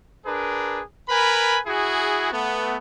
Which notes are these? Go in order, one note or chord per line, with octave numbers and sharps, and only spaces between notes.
D4 G#4 A#4 B4
A#4 B4 G#5 B5
E4 F#4 G#4
A3 B3